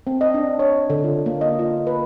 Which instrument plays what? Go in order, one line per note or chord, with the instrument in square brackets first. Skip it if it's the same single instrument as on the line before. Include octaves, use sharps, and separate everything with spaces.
[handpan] C4
D#5
D4
C#5
D3
F4
A#3
D#5
F4
B4